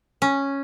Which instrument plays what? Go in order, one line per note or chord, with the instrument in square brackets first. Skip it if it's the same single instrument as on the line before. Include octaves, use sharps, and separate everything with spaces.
[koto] C#4